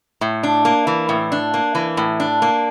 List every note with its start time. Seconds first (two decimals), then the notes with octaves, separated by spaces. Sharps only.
0.21 A2
0.43 D4
0.65 A#3
0.87 E3
1.09 A2
1.32 D4
1.54 A#3
1.75 E3
1.97 A2
2.20 D4
2.42 A#3